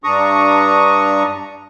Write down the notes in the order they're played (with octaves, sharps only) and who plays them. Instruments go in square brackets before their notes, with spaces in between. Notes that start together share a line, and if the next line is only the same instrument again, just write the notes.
[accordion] G2 D4 A#5 C#6 D#6